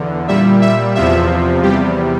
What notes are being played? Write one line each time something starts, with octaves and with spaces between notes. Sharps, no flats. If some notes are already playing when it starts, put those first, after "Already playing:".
Already playing: E2 D3
A#2 G3 E5
E5
E2 C3 F3 E5
E2 C3 G3 G4